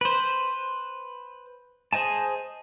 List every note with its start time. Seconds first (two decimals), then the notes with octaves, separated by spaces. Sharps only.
0.01 B4 C5
1.93 G#4 C5 D#5 G#5 A5